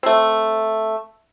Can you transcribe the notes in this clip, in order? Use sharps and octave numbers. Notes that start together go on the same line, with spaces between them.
A3 C4